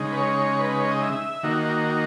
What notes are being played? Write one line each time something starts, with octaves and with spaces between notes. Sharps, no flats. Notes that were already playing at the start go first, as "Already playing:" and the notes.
Already playing: C#3 G#3 D#4
B4
C#5
B4
B4
C#5
D#5
E5
D#3 A#3 D#4 F#4